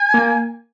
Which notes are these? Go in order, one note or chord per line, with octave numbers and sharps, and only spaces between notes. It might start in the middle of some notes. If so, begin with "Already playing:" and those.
Already playing: G#5
A#3